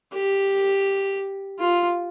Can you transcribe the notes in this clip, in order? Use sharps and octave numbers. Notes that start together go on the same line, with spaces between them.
G4
F4